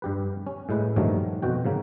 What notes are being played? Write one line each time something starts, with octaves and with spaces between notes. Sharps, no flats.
G2 G4 B4
C#4
A2 G#3 B4
G2 A#2 D#3 F3 F#3 A3
F2 B2 F#4 G5
G#2 C#3 A#3